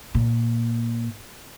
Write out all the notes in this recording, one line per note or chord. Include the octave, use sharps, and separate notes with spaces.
A#2